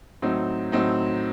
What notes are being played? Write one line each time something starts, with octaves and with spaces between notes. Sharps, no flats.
A2 F#3 C4 D#4
A2 F#3 C4 D#4